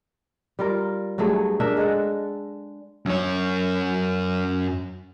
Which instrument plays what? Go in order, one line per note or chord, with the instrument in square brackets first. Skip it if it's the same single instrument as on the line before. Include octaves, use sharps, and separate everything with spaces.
[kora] G3 F4 A#4
G2 F#3 A3 G#4
D4 G#4 A#4 E5
G#3 A4 F#5
[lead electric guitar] F#2 C#5